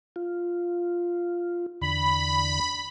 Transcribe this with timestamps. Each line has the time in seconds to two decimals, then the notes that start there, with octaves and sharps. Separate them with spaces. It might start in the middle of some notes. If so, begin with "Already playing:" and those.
0.16 F4
1.81 E2 D3 B5